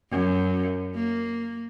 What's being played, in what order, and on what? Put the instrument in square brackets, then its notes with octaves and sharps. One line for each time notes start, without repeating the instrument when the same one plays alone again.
[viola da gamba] F#2
A#3